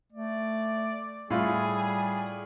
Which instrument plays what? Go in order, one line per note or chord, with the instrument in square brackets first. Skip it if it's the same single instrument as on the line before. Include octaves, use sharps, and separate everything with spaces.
[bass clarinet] A3 [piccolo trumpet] D5
[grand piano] A2 F4 [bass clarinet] G3 [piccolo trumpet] G#4